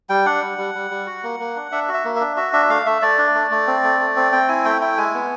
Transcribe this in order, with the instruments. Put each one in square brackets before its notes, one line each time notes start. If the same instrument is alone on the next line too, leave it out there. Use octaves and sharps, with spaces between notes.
[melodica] G3 G5
D4 F#5
G3
G3
G3
G3
F#4
A#3
A#3
D4
D4 E5
F#4
E5
A#3
D4 E5
F#4 E5
D4 E5
A3 F5
A3 E5
A3 D5
D4
A3
A3
C4
A3
A3
C4
C4 G5
E4 G#5
A3 G5
E4 G5
G#3 G#5
B3